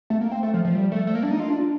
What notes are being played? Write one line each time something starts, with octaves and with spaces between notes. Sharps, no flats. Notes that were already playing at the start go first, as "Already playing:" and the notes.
A3
A#3
C4
A3
F3
F3
G3
A3
A3
A#3
D4
D#4
F4
D4